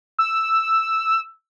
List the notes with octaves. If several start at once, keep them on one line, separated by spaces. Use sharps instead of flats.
E6